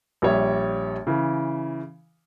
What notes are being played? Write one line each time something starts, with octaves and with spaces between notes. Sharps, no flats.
A#1 G3 C#5 E5
C#3 E3